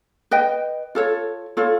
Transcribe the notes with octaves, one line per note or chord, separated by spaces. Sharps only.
B4 D#5 G5
F4 A4 C#5
F4 A4 C#5